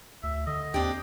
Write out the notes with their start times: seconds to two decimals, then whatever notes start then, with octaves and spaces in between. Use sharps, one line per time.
0.23 D2 E5
0.47 D3 D#5
0.74 D#2 C4 D4 G4